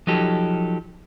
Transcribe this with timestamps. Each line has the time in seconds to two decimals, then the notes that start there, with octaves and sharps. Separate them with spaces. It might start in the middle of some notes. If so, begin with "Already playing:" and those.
0.07 F3 F#3 D#4 G4 A4